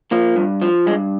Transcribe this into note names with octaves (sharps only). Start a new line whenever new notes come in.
F3 A#3
G2
F3
G2 G#3